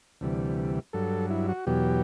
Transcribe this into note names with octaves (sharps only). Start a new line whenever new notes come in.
D2 C3 E3 G3
G2 F#3 A4
E4
F#4
E2 B2 F#3 G4